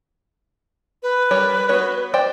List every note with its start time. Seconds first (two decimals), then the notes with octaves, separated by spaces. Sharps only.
1.03 B4
1.31 G3 A#4 C#5
1.69 B3 F#4 C#5
2.14 C5 D5 G5